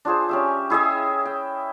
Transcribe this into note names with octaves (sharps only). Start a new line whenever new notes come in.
D4 F4 G#4 C5
C#4 G4 E5
E4 G#4 D#5 E5
G5